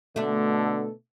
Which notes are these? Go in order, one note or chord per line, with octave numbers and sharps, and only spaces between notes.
B2 D3 A3 D4 A4